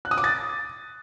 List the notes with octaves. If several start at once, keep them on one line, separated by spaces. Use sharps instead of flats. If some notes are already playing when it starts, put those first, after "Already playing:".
F#6
D#6
D6
A6